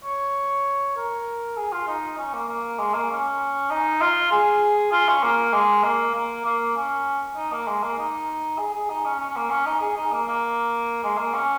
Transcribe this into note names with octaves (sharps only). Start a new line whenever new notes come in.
C#5
A#4
G#4
F4
D#4
C#4
A#3
A#3
G#3
A#3
C#4
D#4
F4
G#4
F4
C#4
A#3
G#3
A#3
A#3
A#3
C#4
D#4
A#3
G#3
A#3
D#4
G#4
G#4
D#4
C#4
C#4
C#4
A#3
C#4
D#4
G#4
D#4
A#3
A#3
G#3
A#3
C#4